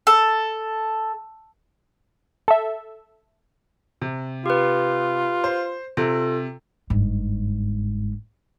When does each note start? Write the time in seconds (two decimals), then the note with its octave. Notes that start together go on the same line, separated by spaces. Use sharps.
0.07 A4
2.48 A4 E5
4.01 C3
4.46 F4 G4 B4
5.44 C5
5.97 C3 F4 A4
6.90 G1 G#2